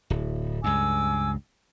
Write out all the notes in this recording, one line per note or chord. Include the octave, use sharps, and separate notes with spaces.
D1
C#2 G2 G#5 D6 E6